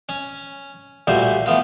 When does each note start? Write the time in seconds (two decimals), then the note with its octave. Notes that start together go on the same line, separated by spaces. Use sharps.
0.09 C#4
1.07 A#2 G3 A3 F#4 C5
1.46 E3 A3 B3 F4